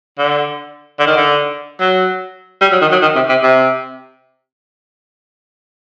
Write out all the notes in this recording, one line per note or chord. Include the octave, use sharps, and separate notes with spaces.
D3
D3
D#3
D3
F#3
G3
F#3
D#3
F#3
D#3
C3
C3
C3